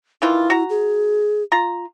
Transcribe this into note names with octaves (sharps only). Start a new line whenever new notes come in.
D#3 E3 E4 F4
F#4 A#5
G#4
F4 A#5